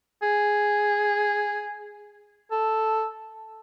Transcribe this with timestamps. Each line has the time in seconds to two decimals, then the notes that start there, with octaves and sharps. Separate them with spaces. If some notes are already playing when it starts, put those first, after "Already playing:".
0.22 G#4
2.51 A4